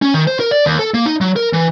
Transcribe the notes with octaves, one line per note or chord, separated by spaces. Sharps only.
C#4
D#3
C5
A#4
D5
D#2
A4
A#3
D#4
F#3
A#4
E3